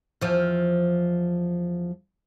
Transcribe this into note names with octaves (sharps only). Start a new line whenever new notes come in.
E2 F3